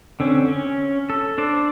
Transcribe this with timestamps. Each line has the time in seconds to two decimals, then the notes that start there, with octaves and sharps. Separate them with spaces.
0.20 D3 C4 C#4
0.48 C#4
1.10 A4
1.38 D4 C5 D5